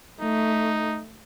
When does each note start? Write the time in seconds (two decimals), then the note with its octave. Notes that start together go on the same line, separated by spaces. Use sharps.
0.21 A3 D#4